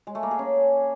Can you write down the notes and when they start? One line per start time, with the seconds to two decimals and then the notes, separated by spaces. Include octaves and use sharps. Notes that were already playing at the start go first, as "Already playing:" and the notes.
0.07 G#3
0.15 A3
0.23 A#3
0.31 G#4
0.39 C#4